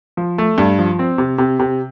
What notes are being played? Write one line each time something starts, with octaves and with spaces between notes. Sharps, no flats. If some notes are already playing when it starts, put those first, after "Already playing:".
F3
A3
G2
F3
C4
C3
C3
C3